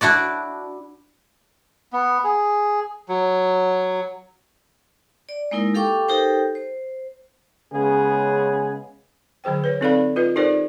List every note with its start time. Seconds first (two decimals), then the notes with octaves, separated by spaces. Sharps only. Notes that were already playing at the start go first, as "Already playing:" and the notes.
0.01 D4 E4 F#4 D5
1.93 B3
2.24 G#4
3.09 F#3
5.29 D5
5.51 G#3 A#3 D#4 E4 A#4
5.74 G4 A4 F5 G5 C#6 D6
6.08 D#4 G4 A4 A#4 C5 G5
6.55 C5
7.72 C#3 G#3 B3 C#4 G#4
9.44 D3 F#3 G#4 C5 G5
9.64 B4 C#5
9.81 C4 D#4 A4 D5 F5 B5
10.16 F4 B4 D#5
10.36 D#4 G4 A4 A#4 C5 D5